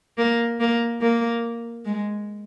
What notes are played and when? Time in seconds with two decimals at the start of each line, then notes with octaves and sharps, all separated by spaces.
0.18 A#3
0.60 A#3
1.01 A#3
1.85 G#3